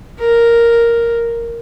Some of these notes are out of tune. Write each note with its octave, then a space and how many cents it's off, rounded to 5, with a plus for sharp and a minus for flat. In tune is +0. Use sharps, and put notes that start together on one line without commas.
A#4 +0